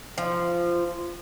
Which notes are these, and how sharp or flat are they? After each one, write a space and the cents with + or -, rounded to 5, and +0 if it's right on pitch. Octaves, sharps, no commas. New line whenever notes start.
F3 -15